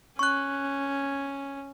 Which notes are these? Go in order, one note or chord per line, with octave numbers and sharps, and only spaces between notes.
C#4 C#6 F#6